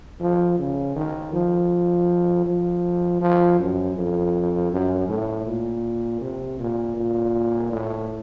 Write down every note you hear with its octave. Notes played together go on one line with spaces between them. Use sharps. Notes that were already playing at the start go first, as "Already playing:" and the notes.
F3
C#3
D#3
F3
F3
F3
F#2
F2
F#2
A2
A#2
C3
A#2
A#2
A2